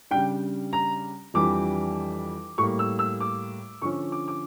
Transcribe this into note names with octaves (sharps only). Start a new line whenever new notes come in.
C#3 G3 D4 G5
A#5
F2 E3 G3 D4 D6
A2 G3 A#3 C#6
E6
E6
D6
D3 F3 C#4 C#6
D6
D6